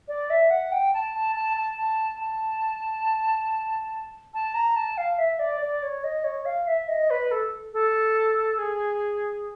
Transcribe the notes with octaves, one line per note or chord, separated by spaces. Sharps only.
D5
E5
F#5
G5
A5
A5
A5
A5
A5
A5
A5
A#5
A5
F5
E5
D5
D5
C#5
D#5
C#5
F5
E5
D#5
B4
A4
A4
G#4